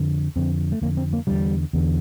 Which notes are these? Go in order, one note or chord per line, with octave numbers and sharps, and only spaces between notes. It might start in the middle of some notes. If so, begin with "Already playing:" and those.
Already playing: F2 D3
F2 D3 C4
A3
F2 D3 A#3
C4
A#3
E2 D3 G3
E2 D3